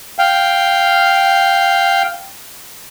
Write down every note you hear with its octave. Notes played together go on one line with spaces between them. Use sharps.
F5 G5